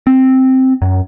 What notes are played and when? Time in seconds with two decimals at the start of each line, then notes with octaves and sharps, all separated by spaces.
0.07 C4
0.82 F#2